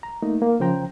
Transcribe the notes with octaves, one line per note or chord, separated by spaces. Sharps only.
A#5
A3 A#3 D#4
A#3
C#3 F3 C5 G5 A#5